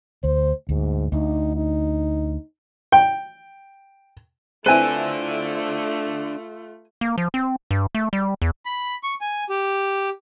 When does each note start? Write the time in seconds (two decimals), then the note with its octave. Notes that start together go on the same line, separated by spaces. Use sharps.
0.24 D2 C5
0.69 D2 G#2
1.12 D2 D#4
1.56 D#4
2.92 G5
4.66 A3 C4 D4 E4 F4 A4 B4 G#5
7.01 A#3
7.18 F3
7.34 C4
7.71 G2
7.95 A3
8.13 G3
8.42 E2
8.66 B5
9.03 C#6
9.21 G#5
9.50 G4